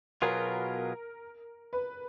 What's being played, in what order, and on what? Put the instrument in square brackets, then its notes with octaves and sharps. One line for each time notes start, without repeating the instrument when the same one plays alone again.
[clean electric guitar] B2 F#3 B3 F4 G#4 [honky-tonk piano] A#4
[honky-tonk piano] B4